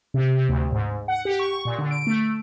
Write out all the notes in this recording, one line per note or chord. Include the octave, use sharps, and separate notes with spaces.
C3
C3
D2
G#2
F#5
G4
C#6
A#2
D3
D7
A3